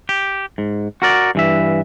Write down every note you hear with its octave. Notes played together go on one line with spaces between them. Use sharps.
G4
G#2
F#4 A#4 D5
G2 E3 E5